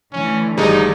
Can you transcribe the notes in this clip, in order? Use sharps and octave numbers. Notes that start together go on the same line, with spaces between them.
D3 E3 A3 C#4
G#1 G3 G#3 D#4